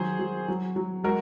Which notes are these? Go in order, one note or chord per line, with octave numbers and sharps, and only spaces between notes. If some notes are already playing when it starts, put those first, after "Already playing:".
Already playing: D#3 F#3 G#4 C5
F#3
F#3
F#3
G#3 F#4 A#4